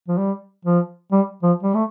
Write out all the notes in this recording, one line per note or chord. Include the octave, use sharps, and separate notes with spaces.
F3
G3
F3
G3
F3
G3
A3